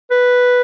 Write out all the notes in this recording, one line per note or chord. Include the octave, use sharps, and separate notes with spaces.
B4